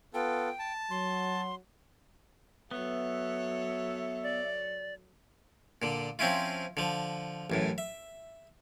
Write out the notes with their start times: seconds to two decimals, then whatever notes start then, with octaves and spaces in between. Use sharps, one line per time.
0.14 B3 F4 A4 G5
0.59 A5
0.90 F#3 C6
2.71 F#3 B3 A4 C#5 E5
4.23 D5
5.82 A#2 D3
6.19 F3 C4 C#4 E4 F4
6.77 D3 F3
7.50 A1 F#2 A2
7.78 E5